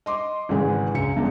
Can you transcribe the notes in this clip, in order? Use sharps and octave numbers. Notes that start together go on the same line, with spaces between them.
D#5 C6 D6
G#1 G#2 C#3 E3 G#3
C#2 F#2 C#7
E2 C#3 G#3